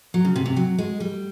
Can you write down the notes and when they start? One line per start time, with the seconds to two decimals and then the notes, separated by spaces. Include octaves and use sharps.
0.14 F#3
0.25 C#3
0.36 C3
0.46 C3
0.56 F#3
0.78 G#3
1.00 G3